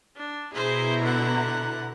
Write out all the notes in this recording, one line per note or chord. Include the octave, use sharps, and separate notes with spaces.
D4
B2 E4 G#4 C5 A#5
D3 F#5